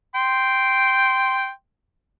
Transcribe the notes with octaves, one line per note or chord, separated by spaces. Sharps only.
G5 C6